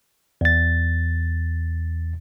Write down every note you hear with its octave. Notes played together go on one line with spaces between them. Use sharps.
E2 A6